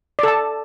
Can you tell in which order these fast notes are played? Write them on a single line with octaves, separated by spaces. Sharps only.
D5 A4 A5